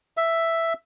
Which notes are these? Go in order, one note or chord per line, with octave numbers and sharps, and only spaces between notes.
E5